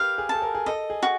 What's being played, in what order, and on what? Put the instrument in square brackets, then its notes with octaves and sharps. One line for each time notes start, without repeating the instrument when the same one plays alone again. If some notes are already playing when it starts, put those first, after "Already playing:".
Already playing: [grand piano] G4 A#4 B4 [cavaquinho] F5
[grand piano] G#4
[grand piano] A4 [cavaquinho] A5
[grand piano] A#4
G#4
[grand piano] A4 [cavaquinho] D#5
[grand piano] G#4
[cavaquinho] F#4